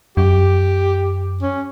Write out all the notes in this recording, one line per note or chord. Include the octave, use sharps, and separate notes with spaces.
F#2 G4
C#4